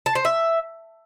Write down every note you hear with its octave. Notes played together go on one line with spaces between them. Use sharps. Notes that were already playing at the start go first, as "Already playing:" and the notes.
A5
C5
E5